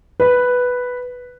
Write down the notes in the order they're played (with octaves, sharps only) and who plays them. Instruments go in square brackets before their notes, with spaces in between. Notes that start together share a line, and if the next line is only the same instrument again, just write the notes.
[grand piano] B4